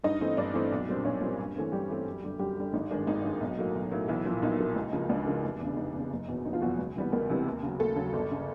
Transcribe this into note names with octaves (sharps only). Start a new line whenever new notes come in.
G2 D#4 D#5
E3 A3 C4
G2 D4 D5
E3 A3 C4
B1
A#2 G3 C4
B1 C#4 C#5
A#2 G3 C4
G2
E3 A3 C4
G2 G3 G4
E3 A3 C4
F#2
D3 G3
F#2 G3 G4
D3 G3
G#1 D#4
G2 D#3 G#3 D4
G#1 D#4
G2 D#3 G#3
B1
A2 F#3 A#3
B1
A2 F#3 A#3
B1 E3 E4
A#2 F3 A#3
B1 D#4
A#2 F3 A#3
C#2
C#3 F3 A#3
C#2 D4
C#3 F3 A#3
F1
E2 C#3
F1 D#4
E2 C#3
F#1
E2 B2
F#1 D#4
F3 F4
E2 B2 F#3 F#4
C#2
C3 E3 G3 B3
C#2 A#3 A#4
C3 E3 G3 B3
D#2
C#3 F#3
D#2 A3 A4
C#3 F#3
G1
C#3